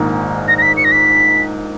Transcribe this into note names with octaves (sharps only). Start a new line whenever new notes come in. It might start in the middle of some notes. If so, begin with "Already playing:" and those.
Already playing: A#1 G#2 D#3 A#3
A#6
A#6
B6
C#7
A#6
B6